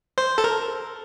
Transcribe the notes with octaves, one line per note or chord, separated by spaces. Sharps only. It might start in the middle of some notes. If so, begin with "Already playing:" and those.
C5
A4
A#4